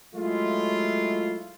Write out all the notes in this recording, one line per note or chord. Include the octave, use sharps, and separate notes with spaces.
F#3 G#3 A3 E4 F4